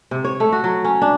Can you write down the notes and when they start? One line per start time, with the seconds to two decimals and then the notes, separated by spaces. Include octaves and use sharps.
0.11 C3
0.24 C#5
0.40 A3
0.52 F#4
0.64 F#3
0.84 C#4
1.02 D4